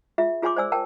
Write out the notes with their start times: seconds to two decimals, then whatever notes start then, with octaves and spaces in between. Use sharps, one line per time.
0.18 F4 G#4 E5
0.42 F4 G#4 C#5 G#5 C6 D6
0.56 C5 D5 G#5 E6
0.72 A#4 G5 A5